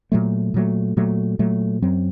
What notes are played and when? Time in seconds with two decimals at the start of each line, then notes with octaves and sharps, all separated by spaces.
0.12 A#2 F#3 A3
0.54 A#2 F#3 A3
0.97 A#2 F#3 A3
1.39 A#2 F#3 A3
1.82 F#2 F#3 C4